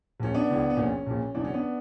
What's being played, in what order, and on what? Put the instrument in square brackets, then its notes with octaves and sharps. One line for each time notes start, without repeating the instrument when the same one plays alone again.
[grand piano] A#1 A#2 C#4
B3 D4
C#2 C#3 E3
B3
A#1 A#2 C#4
A#1 A#2
F#1 E2 B2 D4
C#4
B3 D4